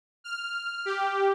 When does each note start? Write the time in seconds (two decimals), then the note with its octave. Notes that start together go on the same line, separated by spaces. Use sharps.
0.24 F6
0.85 G4